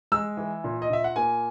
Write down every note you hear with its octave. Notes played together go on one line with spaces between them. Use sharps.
G#3 E6
E3
A#2
D#5
A#2 E5
F#5
A#3 G#5